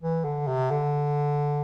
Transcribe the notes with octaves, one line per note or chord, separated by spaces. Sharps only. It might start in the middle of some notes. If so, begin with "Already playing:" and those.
E3
D3
C3
D3